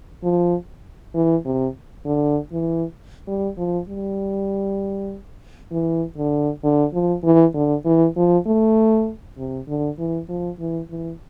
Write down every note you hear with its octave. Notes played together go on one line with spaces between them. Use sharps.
F3
E3
C3
D3
E3
G3
F3
G3
E3
D3
D3
F3
E3
D3
E3
F3
A3
C3
D3
E3
F3
E3
E3